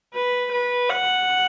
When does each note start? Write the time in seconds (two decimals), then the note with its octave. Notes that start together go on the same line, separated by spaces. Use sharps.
0.14 B4
0.52 B4
0.90 F#5